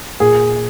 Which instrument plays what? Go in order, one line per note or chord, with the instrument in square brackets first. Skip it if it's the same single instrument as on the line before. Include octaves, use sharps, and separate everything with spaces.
[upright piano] A#2 G#4